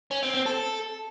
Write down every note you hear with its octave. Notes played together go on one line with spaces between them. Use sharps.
C#4
C4
C4
A4